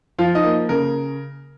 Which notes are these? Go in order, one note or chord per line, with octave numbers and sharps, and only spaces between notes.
F3 F4 F5
D#4 D#5
A#3
C#3 A#4